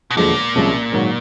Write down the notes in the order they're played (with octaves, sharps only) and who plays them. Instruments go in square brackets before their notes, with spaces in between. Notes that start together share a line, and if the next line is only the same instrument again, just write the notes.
[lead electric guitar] B2
[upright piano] E1 D#2 D3 F3 G#3 [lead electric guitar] A#2
[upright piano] C2 C3 F3 G#3 C#4
G#2 D#3 F#3